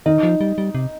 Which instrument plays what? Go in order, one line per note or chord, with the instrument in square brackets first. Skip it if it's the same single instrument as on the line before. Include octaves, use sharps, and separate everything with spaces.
[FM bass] D#3 [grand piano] D#4
[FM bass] F3
G3
G3
C3